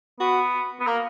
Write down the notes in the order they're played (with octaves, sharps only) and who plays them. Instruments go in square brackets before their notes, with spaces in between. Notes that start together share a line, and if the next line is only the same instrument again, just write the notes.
[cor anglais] B3 [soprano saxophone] F#4
[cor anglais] B3
[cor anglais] A#3 [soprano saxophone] A#4